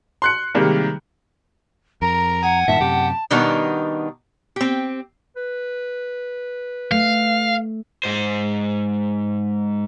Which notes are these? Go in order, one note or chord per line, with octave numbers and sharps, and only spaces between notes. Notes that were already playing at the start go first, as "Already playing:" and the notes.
C6 F#6 C#7
C3 D#3 G3 G#3 A#3
F2 A#4 A#5
F#5 G#5
G2 A#2 D#3 E5 A5
F#2 C3 G4
B2 D#3 G3 B3 D4 D#4
C4 G4
B4
A3 F5
G#2 C5